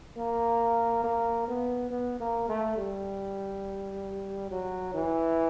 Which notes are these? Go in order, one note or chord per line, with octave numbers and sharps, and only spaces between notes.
A#3
A#3
B3
B3
A#3
A3
G3
F#3
E3